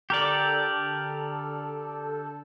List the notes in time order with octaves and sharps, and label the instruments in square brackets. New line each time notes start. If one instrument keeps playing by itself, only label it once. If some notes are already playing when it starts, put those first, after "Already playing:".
[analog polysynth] D3 A4 [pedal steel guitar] G4 A#4 D5